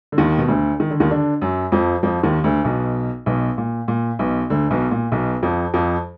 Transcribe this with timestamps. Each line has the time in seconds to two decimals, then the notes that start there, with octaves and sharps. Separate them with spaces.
0.12 D3
0.18 D#2 D#3
0.38 B2
0.48 D2 D3
0.80 D#3
0.90 D3
1.00 D#2 D#3
1.11 D3 D4
1.42 F#2 F#3
1.72 F2 F3
2.03 F2 F3
2.23 D#2 D#3
2.44 D2 D3
2.64 B1 B2
3.26 B1 B2
3.58 A#2
3.88 A#2
4.19 B1 B2
4.50 D2 D3
4.71 B1 B2
4.91 A#2
5.12 B1 B2
5.43 F2 F3
5.74 F2 F3